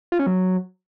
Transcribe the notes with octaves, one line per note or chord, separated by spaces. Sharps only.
F4
C#4
F#3